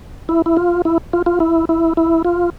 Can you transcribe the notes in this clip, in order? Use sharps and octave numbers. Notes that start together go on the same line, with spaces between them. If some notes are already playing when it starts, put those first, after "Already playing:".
E4
E4
F4
E4
F4
F4
E4
E4
E4
F4